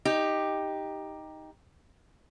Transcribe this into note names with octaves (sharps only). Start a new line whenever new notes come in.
D#4 G4